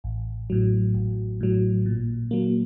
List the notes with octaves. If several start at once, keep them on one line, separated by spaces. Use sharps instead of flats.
A1
A2 F#3
A1
A2 F#3
A#2
F#3 A#3